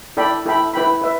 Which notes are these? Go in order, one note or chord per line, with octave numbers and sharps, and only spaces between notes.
E4 A4 D5 G5 B5
E4 A4 G5 B5
E4 B4 G5 B5
B4 E5